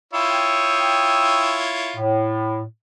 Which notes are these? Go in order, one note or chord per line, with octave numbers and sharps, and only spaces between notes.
E4 F4 C#5 G5 D#6 E6
A2